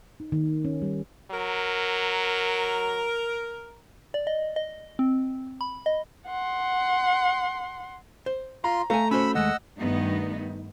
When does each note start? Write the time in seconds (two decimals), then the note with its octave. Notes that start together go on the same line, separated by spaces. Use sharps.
0.20 D#4
0.32 D#3
0.65 C#4
0.82 G3
1.31 F#3 A#4
4.14 D5
4.27 D#5
4.56 D#5
4.99 C4
5.61 B5
5.86 D#5
6.27 F#5 C6
8.26 C5
8.64 F4 A#5 C6
8.90 A3 F5 G#5 A#5
9.11 C#4 F#4 C5 B5 E6
9.35 D#2 G#3 D#5 F#5 E6
9.79 G2 D#3 A3 B3 D#4